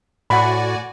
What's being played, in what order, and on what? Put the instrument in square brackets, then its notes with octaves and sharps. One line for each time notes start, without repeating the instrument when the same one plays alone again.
[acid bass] A2 [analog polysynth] F#4 D5 G#5 [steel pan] F#5 B5